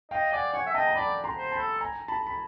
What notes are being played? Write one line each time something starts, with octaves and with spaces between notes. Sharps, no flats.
D#5 F5 G5
D5 F#5 G#5
C#5 F#5 G#5
E5
D#5 G5 A5
A#5
D5 A5 B5
A#5 C6
C5
A5 B5
A4
G#5 A#5
A5 B5
B5